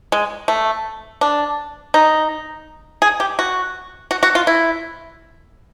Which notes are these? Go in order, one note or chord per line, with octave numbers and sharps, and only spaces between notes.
G#3
A3
D4
D#4
G#4
G4
F#4
F#4
F#4
F4
E4